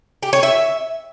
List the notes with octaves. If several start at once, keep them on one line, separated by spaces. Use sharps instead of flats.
G4
C#5
E5